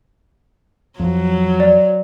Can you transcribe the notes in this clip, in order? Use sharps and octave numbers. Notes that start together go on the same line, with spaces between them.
F2 F#3
D5